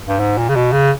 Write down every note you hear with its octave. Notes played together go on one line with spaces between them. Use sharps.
G2
G#2
A#2
C#3
B2
C#3